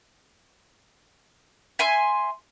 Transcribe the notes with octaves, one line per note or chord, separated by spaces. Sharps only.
E5 G#5 C6